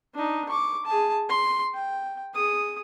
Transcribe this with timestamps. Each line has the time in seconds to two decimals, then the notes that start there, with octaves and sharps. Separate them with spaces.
0.14 D4 D#4
0.49 C#6 D6
0.85 G#4 A5
1.29 C6
1.74 G5
2.34 G#4 D#6